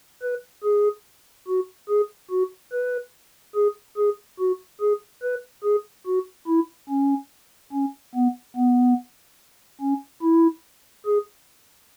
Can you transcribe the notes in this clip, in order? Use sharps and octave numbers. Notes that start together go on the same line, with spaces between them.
B4
G#4
F#4
G#4
F#4
B4
G#4
G#4
F#4
G#4
B4
G#4
F#4
E4
C#4
C#4
B3
B3
C#4
E4
G#4